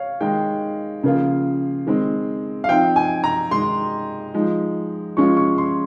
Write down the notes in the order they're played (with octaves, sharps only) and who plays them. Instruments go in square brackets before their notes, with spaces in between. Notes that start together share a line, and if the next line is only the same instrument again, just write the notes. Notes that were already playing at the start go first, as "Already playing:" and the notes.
Already playing: [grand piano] C#5 F5
[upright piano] D#3 G#3 D#4 [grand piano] G5
[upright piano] C#3 F3 A#3 F4
D#3 G#3 C4
[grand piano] F5
[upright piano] F3 C4 D#4 [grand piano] G5
[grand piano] G#5
A#5
[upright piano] D#3 G#3 D#4 [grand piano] C6
[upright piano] F3 G#3 D#4
[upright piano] F3 G#3 C#4 F4 [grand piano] C#6
[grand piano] C#6
C6